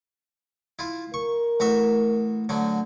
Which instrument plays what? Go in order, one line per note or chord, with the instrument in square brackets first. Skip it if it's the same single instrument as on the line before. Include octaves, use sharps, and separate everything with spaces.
[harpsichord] E4 F4
[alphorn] A#4 [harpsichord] C#6
[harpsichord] A1 F#4 E5
D2 D3 F#3